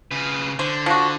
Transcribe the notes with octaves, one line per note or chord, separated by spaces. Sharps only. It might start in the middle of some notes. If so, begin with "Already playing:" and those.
C#3 B4
D3 C5
F3 F#4